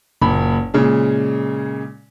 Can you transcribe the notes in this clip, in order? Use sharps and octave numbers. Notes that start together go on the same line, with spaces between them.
F#1 A#2 B5
A#2 C#3 G#3